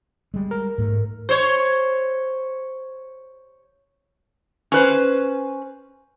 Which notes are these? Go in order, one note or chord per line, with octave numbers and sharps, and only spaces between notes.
G3 G#3
A#4
G#2 A3
C5 C#5
C#4 B4 C5